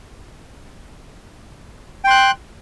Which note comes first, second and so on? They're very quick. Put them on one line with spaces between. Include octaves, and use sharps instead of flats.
G5 C6 F#6